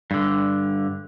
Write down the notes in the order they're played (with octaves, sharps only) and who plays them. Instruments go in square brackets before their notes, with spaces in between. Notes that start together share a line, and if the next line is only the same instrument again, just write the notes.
[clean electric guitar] G2 D3